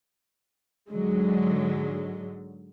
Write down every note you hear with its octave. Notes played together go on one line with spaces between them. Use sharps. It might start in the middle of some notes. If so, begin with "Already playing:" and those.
G#2 D3 F#3 G#3